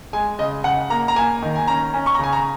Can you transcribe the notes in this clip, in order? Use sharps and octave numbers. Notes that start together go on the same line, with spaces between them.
G#3 G#5
C#3 D#5
C#3 F#5
A#3 A#5
A#5
A#3 G#5
D#3
G#5
C#4 A#5
C#4
C#6
A#5
C#3 G#5
A#5